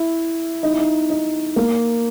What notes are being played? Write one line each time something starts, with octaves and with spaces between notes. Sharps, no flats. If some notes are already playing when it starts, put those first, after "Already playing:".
Already playing: E4
D#4
E4
D#4
D#4
A#3